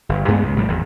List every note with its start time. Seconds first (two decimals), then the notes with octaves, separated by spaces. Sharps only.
0.09 G1
0.28 G2 G#3 A3 B3
0.43 C#2
0.56 A#1 A2 G3
0.68 G#1 E2